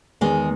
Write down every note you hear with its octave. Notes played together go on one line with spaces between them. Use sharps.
E2 D#3 G#3